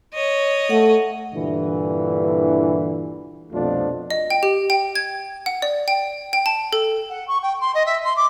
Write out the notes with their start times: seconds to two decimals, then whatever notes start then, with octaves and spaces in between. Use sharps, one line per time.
0.14 C#5 D#5
0.70 A3 F#5
1.33 G2 A#2 D3 E3
3.52 C2 F2 B2 A3 D4 F4
4.11 D#5
4.30 G5
4.43 G4
4.70 G5
4.96 G#6
5.46 F#5
5.62 D5
5.88 G5
6.33 G5
6.46 A5
6.73 A4
7.09 F#5
7.28 C#6
7.43 G5
7.61 C6
7.75 D#5
7.86 E5
8.04 C6
8.16 D6